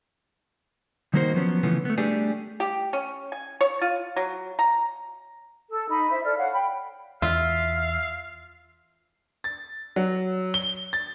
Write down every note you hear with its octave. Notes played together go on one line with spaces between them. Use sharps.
D#3 G3 A#3 D#4 F#4 C5
F3 F#3 B3 C#4
C#3 E3 F3 A3 B3
A3 B3
G3 A3 D4 G4 G#4
G4
C#4
G#5
C#5
F4
F#3
A#5
A4 E6
D#4 B5
E4 C5 E5
A4 D5 F6
C#5 F5 F#5
G5 B5
E2 F4 E5 F5
A6
F#3
G7
A6